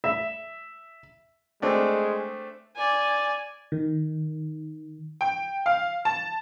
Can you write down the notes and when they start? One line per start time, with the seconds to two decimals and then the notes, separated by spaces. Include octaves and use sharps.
0.04 E5
1.62 G#3 A3 C4 D4
2.76 D5 G#5
3.72 D#3
5.21 G5
5.66 F5
6.05 A5